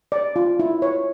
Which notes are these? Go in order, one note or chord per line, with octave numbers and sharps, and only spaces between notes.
D5
F4
E4
C#5